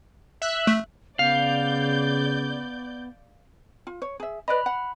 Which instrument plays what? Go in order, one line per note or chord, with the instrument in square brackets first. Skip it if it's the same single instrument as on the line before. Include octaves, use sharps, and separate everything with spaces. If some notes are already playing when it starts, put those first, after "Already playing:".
[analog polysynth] E5 F#6
[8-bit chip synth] A3
[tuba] C#3 [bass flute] B3 [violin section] D5 G6 [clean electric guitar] F5
[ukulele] F4
C#5
G#4 E5
[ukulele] B4 D5 D#5 [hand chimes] B5 F#6
[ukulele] F#5